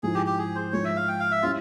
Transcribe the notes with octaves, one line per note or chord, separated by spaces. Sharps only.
G#2 F3 G#3 E4 G#4
G4
G4
G#4
C5
G#2 F3 G#3 C#5
E5
F5
G5
F5
E5
G3 C#4 E4 F4